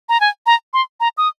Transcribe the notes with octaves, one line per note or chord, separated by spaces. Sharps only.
A#5
G#5
A#5
C6
A#5
D#6